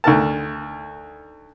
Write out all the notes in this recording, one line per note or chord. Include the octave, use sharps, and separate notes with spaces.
D2 D#3 A#4 A5